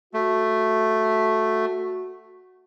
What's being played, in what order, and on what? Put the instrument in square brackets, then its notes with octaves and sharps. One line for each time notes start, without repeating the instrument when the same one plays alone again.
[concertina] A3 [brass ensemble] F#4